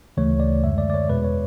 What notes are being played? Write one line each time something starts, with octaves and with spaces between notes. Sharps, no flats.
D2 C#3 E3 A3 C#5
D5
F#2 D3 G#3 E5
D5
D5
C#5
E2 B2 G#3 B4
C#5